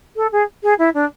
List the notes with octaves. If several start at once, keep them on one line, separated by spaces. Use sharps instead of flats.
A4
G#4
G#4
E4
D4